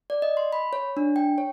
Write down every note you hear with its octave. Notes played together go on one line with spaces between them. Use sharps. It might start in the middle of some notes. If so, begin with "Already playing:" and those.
D5
D#5
C6
B5
C#5
D4
G5
C#5